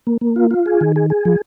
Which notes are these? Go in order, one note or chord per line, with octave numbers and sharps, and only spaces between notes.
A#3
A#3
F4
F4
G#4
D#3
G#4
G#4
F3